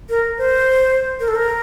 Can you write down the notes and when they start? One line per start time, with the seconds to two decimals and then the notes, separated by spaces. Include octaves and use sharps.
0.09 A#4
0.38 C5
1.20 A#4
1.28 A4
1.35 A#4